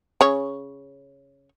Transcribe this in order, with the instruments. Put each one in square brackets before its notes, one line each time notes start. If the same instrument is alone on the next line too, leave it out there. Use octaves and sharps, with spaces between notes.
[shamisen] C#3 C#5